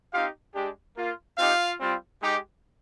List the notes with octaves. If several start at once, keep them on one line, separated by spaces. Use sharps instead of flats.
C4 D#4 F4 G4 F5
G#3 D4 G4
A#3 F4
C4 D#4 F4 G4 F5
G3 C4 F4
G#3 D#4 G4